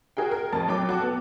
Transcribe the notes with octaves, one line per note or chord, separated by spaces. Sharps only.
F#4 G#4 A#4 G5
A#4
F2 A5 A6
F#3 G5 D6
F#4 A4 D6
B3